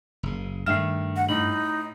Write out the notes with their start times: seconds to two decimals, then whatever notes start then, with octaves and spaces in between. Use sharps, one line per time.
0.23 F#1 C#3
0.66 G2 D#3 A3 E5 F6 C7 E7
1.16 F#5
1.29 A2 D#4 F#7